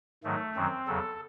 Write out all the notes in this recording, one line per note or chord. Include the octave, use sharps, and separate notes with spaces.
G#2 D#3 F#3 A3
F#2 D#3 F#3 C4
E2 C#3 F#3 A4